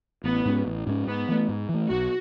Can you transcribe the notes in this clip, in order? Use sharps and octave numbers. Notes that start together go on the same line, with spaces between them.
A1 B3
G#2 G#3 C#4
A1
G#2 G#3 C#4
G#2 B3
E3 A3
G#2
E3
A3
B1 F#4